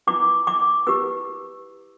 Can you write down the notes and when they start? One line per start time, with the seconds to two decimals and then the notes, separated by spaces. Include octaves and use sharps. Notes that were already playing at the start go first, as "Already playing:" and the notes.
0.07 E4 B4 D6
0.47 D6
0.87 E4 G4 B4 E6